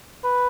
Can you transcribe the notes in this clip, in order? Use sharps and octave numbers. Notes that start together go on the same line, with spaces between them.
B4